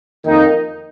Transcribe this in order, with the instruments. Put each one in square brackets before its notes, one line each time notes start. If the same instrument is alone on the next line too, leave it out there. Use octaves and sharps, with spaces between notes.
[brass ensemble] F2 D#3 A#3 D#4